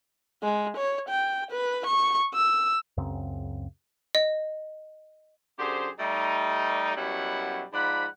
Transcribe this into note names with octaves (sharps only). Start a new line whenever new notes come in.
G#3
C#5
G5
B4
C#6
E6
C#2 F#2 C#3 C4
D#5
F#2 D3 G4 G#4 C5
G3 A3 D#4
F#2 B2 F#3 G3 E4 F#5
G#2 F3 D5 F#5 B5